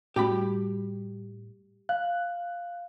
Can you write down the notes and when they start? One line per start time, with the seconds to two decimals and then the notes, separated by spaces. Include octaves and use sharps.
0.16 A2 G3 C#4 F#4 G4 G5 B5
1.89 F5 F#6